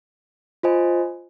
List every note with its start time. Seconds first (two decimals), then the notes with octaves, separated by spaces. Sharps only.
0.63 F4 C5 D#5 G#5